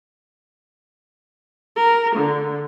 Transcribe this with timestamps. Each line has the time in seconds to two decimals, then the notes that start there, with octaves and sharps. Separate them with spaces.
1.76 A#4
2.15 D3